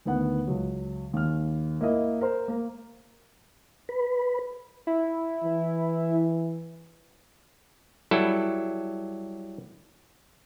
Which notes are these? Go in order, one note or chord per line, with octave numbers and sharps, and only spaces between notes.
D2 D#3 B3 F#5
C#2 F#3
D#2 F6
A#3 E4 D#5
A#4 C5
A#3 A#4
B4
E4
E3
F#3 G3 E4 A4